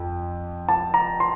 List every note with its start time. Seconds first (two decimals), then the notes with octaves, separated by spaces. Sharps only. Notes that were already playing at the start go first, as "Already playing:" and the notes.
Already playing: F2
0.69 A5
0.94 A#5
1.20 C6